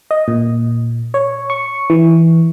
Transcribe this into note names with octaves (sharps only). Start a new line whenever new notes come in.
D#5
A#2
C#5
C#6
E3